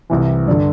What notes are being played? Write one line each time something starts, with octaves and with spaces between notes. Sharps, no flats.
C2 C3 E3
G2 D3 D5